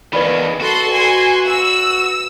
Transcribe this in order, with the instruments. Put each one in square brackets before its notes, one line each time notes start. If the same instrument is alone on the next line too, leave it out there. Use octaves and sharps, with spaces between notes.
[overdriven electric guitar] E2 D#3 [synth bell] B4 D5 B5
[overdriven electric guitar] F#4 [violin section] A4 C6
[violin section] G#5 C6
E6